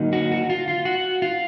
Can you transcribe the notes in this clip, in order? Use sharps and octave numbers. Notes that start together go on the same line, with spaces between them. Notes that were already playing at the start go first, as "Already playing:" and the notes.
Already playing: D3 F#3 A#3 D#4
F#4
F#4
F4
F4
F#4
F4